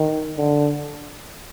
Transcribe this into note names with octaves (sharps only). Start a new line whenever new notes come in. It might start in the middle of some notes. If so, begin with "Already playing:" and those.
Already playing: D#3
D3